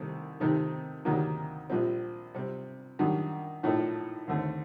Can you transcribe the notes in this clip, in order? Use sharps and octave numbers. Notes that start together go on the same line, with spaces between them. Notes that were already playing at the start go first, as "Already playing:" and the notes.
Already playing: C2 C3 D#3 A3 C4
C3 D#3 A3 C4 D#4
D2 C3 D#3 F#3 A#3
A#1 A#2 G3 C4
C3 G3 C4
F#2 D#3 G3 D4
A#1 A2 A3 D#4 A4
D#2 D3 A3 C4